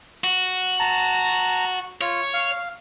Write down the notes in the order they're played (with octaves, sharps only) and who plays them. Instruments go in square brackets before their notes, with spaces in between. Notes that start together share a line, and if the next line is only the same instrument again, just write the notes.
[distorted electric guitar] F#4
[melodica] A5 A#5
[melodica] F4 [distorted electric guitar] C#5
[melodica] F5